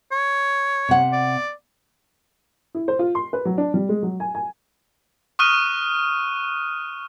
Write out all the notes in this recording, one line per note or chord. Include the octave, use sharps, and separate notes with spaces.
C#5
C3 F#5
D5
E4
C5
F4
C6
B4
F#3
D4
G3
G#3
F#3
G#5
G#5
C#6 D#6 F6 F#6 D#7